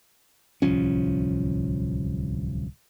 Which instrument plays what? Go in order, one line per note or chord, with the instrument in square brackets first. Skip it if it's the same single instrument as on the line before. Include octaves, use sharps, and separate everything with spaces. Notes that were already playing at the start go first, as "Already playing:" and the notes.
[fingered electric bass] D1 C2 F3 C#4